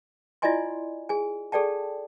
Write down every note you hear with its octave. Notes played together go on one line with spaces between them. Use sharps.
E4 F4 D5 D#5 G#5 C6
G#4 G#5
G#4 A4 D5 G5 A5